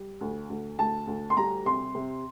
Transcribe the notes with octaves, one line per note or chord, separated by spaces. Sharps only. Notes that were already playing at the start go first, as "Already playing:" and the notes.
Already playing: G3
D2
D2
D2 A5
D2
C6
G3 A#5
C3 C6
C3